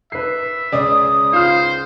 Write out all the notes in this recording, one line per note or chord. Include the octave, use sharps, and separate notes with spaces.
B4 E5 C7
C#2 C#4 D5 D#6
F4 C5 F6